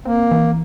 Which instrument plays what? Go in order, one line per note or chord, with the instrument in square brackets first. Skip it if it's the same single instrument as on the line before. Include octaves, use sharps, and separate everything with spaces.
[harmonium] A#3 [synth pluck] C4
[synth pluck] E3